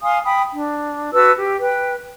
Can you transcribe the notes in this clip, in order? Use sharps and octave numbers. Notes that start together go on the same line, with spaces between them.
F5 G#5 C6 D#6
G5 B5 D#6
D4
F#4 B4 A5 E6
G4
B4 G5